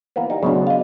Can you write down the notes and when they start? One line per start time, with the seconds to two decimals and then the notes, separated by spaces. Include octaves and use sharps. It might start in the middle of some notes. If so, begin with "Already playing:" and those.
0.16 E3 A#3 B3
0.30 G3 D#4
0.43 D2 C#3 F#3 B3 D4
0.67 D#5 F5